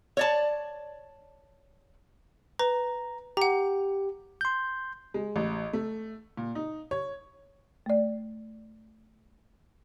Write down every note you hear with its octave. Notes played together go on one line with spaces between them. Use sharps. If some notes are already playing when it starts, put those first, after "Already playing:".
C#5 D5 A5
B4 A#5
G4 F#5 A#5
C6 G6
G#3
A1
A3
A#2
D#4
C#5
A3 D5